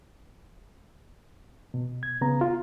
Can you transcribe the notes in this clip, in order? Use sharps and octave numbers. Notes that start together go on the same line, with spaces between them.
B2
G#6
C#3 B3 A#5
F4